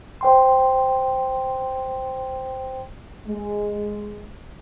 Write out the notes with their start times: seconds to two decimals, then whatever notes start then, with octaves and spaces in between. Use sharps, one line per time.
0.21 C5 G5 C6
3.27 G#3